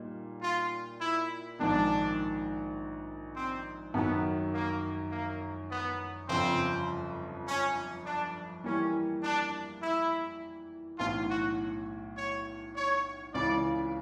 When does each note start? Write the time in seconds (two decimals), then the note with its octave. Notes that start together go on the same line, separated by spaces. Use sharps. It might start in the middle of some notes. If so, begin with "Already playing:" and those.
Already playing: A#2 G3 A#3 D#4
0.42 F4
1.01 E4
1.59 A#1 G#2 D#3 D4
3.36 C4
3.94 F#2 D#3 F#3 B3
4.52 A#3
5.11 A#3
5.70 B3
6.29 G1 F2 C#3 F3 C4
7.47 C#4
8.06 D4
8.64 E3 G3 A#3 C#4
9.23 D4
9.82 E4
10.99 B1 A2 E3 F4
11.29 F#4
12.17 C#5
12.76 C#5
13.34 C#2 C#3 E3 D5